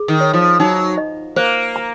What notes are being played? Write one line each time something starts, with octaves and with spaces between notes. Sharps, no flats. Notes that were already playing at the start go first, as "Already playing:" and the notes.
Already playing: G#4
D#3
C#5
F3
F#3 D#4
D#5
A#3 C5
A#5